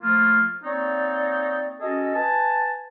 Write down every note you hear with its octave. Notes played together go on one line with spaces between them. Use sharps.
F3 A3 A#3 F4 F6
A#3 C4 D#4 C#5 D5
C#4 F#4 G#4 A4 D#5
B4 G#5 A5